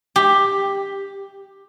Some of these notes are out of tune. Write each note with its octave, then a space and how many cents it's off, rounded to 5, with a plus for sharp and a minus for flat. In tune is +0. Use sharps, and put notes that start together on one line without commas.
G4 +10